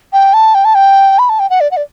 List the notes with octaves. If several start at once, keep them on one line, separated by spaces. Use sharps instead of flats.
G5
A5
G5
A5
G5
B5
A5
G5
F#5
D5
F#5
D5